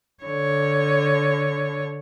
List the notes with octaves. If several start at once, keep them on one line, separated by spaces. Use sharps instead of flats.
D3 C#5